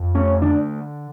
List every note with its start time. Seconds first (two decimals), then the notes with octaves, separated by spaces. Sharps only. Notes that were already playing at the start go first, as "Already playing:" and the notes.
Already playing: F2
0.15 A3 C#4
0.42 D3 D4